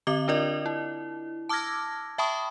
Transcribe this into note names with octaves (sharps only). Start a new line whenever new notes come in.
D3 C4 D#5 D6 G7
D4 F4 A#4 D5 D#5
E4
A5 D6 E6 F6 G#6 A#6
E5 G5 A5 B5 C#6 D#6